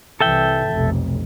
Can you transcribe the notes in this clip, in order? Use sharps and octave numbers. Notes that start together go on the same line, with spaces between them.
C2 E3 A4 E5 G5
F1 B1